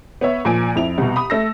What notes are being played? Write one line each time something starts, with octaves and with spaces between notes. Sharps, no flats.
B3 C#5 E5
A#2 F3 G#5 D7
F2 E4 F7
C2 B2
B5 D#6
A3 E6 A#6